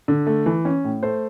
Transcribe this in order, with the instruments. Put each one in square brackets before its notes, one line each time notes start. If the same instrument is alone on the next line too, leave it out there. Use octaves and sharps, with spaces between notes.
[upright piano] D3
A3
E3
C#4
A2
A3 C5